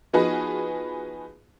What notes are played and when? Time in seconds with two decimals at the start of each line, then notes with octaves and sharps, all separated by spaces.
0.13 F3 B3 D#4 F#4 G#4 B4